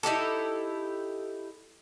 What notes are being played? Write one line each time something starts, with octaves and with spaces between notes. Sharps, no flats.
D#4 E4 G4 A4